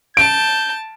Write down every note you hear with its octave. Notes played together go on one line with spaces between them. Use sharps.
A5 G6 D7